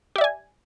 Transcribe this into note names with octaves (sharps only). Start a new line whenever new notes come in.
G4 D5 E5 G#5